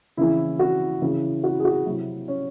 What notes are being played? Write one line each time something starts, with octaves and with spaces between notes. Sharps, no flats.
C#3 E3 E4
F#4
C#3 E3
F#4
G#4
F#4
C3 F#3 E4
C#4